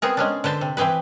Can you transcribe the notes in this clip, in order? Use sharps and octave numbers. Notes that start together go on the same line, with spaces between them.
B3 C4 G#4 A#4
G#3 C#4 D4
D3 B4 C5 A5
C3
E3 C4 G4 G#4 B4